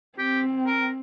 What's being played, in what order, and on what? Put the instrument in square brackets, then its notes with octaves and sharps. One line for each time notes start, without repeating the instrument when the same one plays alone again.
[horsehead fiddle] C4 [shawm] G4
[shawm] A#4